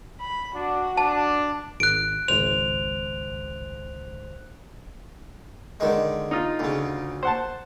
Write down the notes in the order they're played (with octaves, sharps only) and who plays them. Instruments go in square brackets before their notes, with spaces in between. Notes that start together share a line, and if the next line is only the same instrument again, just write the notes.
[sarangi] B5
[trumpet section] D4 [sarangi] F#4
[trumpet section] D4 [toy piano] A5
[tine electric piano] G#1 [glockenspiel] F#6 D7
[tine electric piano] G#1 C#2 C5 [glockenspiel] F7
[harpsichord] D3 D#3 G#3
[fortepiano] D#4 F4
[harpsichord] D2 C#3
[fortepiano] C5 F#5 A5